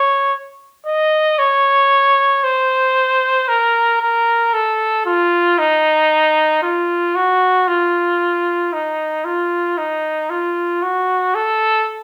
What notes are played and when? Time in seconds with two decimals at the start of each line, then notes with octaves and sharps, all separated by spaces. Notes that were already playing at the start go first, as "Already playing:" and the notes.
Already playing: C#5
0.86 D#5
1.39 C#5
2.44 C5
3.48 A#4
4.01 A#4
4.54 A4
5.06 F4
5.58 D#4
6.63 F4
7.16 F#4
7.68 F4
8.73 D#4
9.25 F4
9.78 D#4
10.30 F4
10.82 F#4
11.35 A4